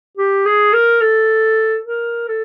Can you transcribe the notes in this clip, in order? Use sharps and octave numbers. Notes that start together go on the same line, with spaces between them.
G4
G#4
A#4
A4
A#4
A4